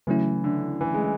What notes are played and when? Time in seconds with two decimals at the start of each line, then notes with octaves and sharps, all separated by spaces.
0.07 C#3 E3 F#3 A3 C#4 E4
0.44 D3
0.81 E3
0.94 G#3